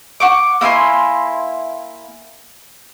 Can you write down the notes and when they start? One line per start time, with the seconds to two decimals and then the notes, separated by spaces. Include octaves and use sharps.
0.20 F#5 C#6 D6
0.61 A#3 E4 G#5 C6